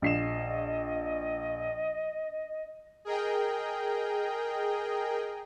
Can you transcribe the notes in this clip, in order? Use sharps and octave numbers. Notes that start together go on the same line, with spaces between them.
A#1 D#5 C7 E7
G#4 A#4 D#5 G5